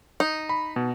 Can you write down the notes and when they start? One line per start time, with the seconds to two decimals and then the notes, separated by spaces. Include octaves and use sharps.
0.20 D#4
0.49 B5
0.76 B2